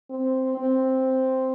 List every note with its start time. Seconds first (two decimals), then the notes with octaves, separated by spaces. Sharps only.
0.10 C4
0.58 C4